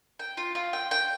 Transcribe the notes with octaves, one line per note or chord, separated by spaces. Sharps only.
G5
F4
F4
G5
G5